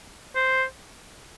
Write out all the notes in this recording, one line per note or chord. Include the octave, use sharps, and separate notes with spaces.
C5